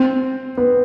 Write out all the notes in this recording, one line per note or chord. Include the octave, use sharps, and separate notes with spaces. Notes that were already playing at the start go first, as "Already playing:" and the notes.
Already playing: C4
B3